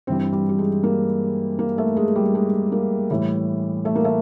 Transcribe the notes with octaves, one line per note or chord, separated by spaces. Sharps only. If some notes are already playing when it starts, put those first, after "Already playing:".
G2 E3 G3 C4
G3
G3
G#3
A#3
A#3
A3
G#3
G3
G#3
A#3
A2 E3 G3
A3
A#3
A3